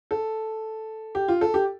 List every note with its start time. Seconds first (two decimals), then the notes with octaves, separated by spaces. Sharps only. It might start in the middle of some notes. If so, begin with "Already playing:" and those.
0.11 A4
1.15 G4
1.28 F4
1.41 A4
1.54 G4